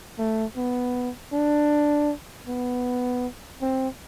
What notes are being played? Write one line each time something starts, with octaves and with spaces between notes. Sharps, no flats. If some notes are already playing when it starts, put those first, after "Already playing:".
A3
B3
D4
B3
C4